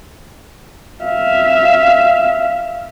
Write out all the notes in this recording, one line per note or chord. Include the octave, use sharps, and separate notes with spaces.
E5 F5